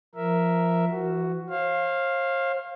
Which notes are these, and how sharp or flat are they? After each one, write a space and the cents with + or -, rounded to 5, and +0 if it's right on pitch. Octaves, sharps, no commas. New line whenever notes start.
F3 -15 A#4 +0 E5 +0
E3 +40 F#4 +5
C5 +45 F5 +0